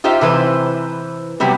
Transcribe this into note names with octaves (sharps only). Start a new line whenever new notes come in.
D#4 F4 G4 C5 E5
C3 E3 B4 C5
C3 F#3 G3 B3 G4